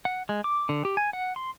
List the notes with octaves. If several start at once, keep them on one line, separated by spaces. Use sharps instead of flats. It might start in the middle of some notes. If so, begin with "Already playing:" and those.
F#5
G#3
D6
D3
G4
G#5
F#5
C6